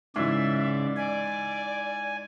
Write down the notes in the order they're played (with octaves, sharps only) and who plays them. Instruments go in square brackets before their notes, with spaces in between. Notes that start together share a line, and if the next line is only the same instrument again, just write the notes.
[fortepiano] G#2 E3 [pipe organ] C#3 D5 [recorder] E5
[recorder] D5 [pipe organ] G#5